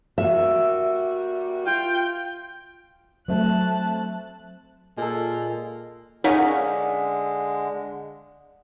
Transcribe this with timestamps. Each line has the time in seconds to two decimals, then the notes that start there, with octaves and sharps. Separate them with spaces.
0.18 G3 A#3 F#4 E5
1.66 F4 G5
3.28 F#3 A3 C4 A5 F#6
4.97 A#2 G#3 A4
6.24 D3 G#3 C#4 D#4 A#4 F5 F#5 B6